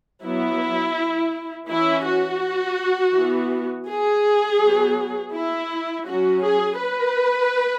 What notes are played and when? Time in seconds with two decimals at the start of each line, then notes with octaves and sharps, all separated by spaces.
0.23 F#3 B3 E4
1.69 E3 C#4 E4
2.04 F#4
3.14 E3 B3
3.87 G#4
4.60 F#3 B3
5.33 E4
6.05 F#3 C#4 F#4
6.42 G#4
6.79 B4